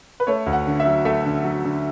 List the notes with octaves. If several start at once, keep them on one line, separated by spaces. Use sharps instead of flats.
B4
A3 C#5
D2
F#5
D3
E5
F#3
A3 E5
D3
F#3
D3